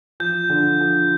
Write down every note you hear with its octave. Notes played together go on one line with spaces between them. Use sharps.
F3 G6
D3
F3